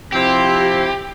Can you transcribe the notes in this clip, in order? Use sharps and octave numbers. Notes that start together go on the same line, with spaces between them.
C3 F3 C4 E4 G4